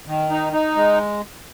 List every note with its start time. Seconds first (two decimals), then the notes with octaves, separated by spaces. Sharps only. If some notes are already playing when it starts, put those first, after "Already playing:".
0.07 D#3
0.30 D#4
0.53 D#4
0.75 G#3